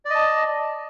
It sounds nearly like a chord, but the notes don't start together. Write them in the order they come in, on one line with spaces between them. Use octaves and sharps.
D5 D#5 A5